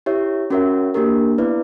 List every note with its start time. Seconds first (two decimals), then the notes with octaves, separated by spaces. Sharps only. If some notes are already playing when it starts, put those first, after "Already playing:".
0.06 E4 G4 C#5 E5
0.50 C#4 F#4 A#4 C#5 E5
0.94 A#3 D4 G4 A#4
1.38 B3 E4 B4 D5